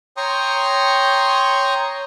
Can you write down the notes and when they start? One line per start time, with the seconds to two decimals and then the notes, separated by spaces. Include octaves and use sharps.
0.17 C#5 G5 A#5 C6 C#6 D#6